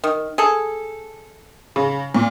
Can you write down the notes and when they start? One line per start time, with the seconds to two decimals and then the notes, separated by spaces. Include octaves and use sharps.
0.04 D#3
0.38 G#4 A4
1.76 C#3
2.15 A#2